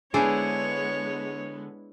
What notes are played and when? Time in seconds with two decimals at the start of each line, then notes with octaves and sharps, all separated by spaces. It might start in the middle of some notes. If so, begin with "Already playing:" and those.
0.14 D3 G#3 B3 D4 E4 G#4 C5 C#5